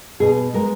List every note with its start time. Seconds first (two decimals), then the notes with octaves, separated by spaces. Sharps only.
0.20 B2 G#4
0.53 G#3 B3 A#4